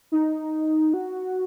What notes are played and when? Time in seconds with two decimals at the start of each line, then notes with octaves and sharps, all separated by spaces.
0.12 D#4
0.94 F#4